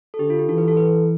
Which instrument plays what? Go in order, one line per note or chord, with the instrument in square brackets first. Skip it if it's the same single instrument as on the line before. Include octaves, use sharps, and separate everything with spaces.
[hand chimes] A4
[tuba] D3 [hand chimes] G4
[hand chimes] F4
G4
[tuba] E3 [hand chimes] A4
[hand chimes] B4
A4
B4